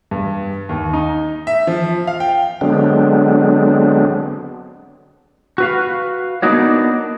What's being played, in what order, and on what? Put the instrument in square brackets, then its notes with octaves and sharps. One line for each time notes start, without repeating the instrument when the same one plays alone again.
[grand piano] G2
D#2
D#4
E5
F3
F5
G5
[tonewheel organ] D3 F#3 G#3 B3 C4 D4
[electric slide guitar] F#4 B4 F5
A#3 B3 D4 D#4 F#4 C#5